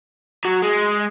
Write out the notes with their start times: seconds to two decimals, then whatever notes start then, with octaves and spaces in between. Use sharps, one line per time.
0.45 F#3
0.62 G#3